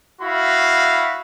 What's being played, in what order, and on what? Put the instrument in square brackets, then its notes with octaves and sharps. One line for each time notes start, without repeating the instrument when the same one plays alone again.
[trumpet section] E4 F#4 F5 B5